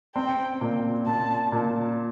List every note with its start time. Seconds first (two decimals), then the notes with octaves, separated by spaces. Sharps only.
0.15 C4 G5
0.61 A#2
1.06 A#2 A5
1.52 A#2